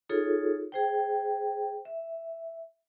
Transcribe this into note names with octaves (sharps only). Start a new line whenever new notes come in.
D#4 F4 G#4 A4 C#5
G#4 C5 G5
E5